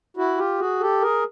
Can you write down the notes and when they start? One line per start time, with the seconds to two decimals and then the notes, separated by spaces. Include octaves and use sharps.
0.17 E4 F#4
0.38 F4 G4
0.59 F#4 G#4
0.80 G4 A4
1.01 G#4 A#4